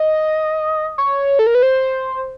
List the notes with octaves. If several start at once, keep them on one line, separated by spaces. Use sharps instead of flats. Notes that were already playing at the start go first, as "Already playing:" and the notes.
Already playing: D#5
C#5
A4
A#4
B4
C5